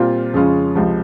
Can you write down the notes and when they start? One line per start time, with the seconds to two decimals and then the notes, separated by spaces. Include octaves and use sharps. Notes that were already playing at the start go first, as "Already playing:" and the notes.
Already playing: A#2 G3 C4 F4
0.34 F2 C#3 G#3 C#4 F4
0.75 C#2 C3 F3